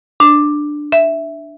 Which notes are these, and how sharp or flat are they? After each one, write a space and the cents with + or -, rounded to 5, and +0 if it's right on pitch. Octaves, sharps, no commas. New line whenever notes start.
D4 +10
E5 +0